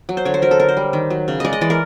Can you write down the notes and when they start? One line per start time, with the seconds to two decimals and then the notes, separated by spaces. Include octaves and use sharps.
0.09 F#3
0.17 C5
0.25 D3 C#5
0.34 C5
0.42 F#3 A#4
0.51 A4
0.59 D3 A#4
0.69 C5
0.77 G3
0.93 D#3
1.10 F#3
1.28 C#3
1.40 G#3 D5 D#5
1.53 D#5
1.61 E3 D5
1.70 A#4